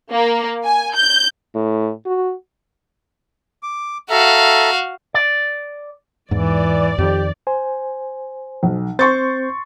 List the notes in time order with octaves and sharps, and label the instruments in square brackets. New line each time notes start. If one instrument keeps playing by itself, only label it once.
[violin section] A#3
G#5
G6
[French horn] A2
F#4
[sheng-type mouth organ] D6
[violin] F#4 F5 [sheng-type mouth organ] A4 E5 A#5
[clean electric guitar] D5
[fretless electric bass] E2 G#2 [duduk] E3 [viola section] D5
[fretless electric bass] F2 D#3 [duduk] G4
[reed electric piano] C5 G#5
[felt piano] B1
[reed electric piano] C4 C5 G6 [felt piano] C6 C#6 A6